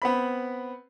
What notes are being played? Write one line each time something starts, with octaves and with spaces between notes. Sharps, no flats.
B3 C4 B5